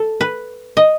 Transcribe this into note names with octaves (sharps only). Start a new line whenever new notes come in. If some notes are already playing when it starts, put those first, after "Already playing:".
Already playing: A4
B4
D#5